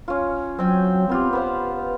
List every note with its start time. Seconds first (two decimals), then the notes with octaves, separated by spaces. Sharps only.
0.08 C#4 F4
0.59 F#3 C4 G5 G#5
1.09 B3 C4 F4 G4
1.33 B3 B4 C5 F5